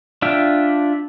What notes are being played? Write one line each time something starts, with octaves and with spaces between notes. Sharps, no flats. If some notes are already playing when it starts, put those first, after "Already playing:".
D4 F4 E5 G5